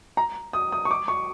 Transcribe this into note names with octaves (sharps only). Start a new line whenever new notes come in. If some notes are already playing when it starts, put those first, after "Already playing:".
A#5
D#6
D#6
C#6
D6
C#6